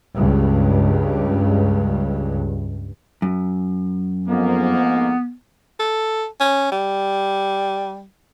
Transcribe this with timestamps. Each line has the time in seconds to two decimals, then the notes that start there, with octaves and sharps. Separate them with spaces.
0.14 C#2 G2
3.22 F#2
4.28 F2 G#2 A#3 B3
5.79 A4
6.40 C#4
6.72 G3